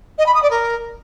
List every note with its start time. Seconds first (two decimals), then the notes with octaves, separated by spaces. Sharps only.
0.18 D#5
0.26 B5
0.35 D#6
0.43 D5
0.51 A#4